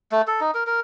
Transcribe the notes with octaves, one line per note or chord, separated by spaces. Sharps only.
A3
A4
D#4
A#4
A#4